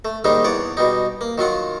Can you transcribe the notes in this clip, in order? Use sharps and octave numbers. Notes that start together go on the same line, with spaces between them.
A3
D#2 G#2 D#3 G3 D#4
E2 C#5 D5 F#5
B2 G3 D#4
A#3
D#3 F#3 F4 F#5